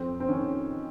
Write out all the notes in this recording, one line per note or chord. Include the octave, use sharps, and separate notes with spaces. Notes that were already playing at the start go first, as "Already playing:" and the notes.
Already playing: F2 C4
C4
D#3 C#4